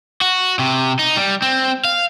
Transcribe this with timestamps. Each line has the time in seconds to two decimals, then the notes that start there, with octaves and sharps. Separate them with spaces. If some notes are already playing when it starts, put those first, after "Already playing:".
0.21 F#4
0.59 C3
0.99 D#4
1.17 G3
1.42 C4
1.85 F5